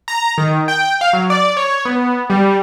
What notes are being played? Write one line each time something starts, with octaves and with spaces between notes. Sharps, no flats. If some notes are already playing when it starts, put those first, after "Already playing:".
A#5
D#3
G5
F5
F#3
D5
C#5
B3
G3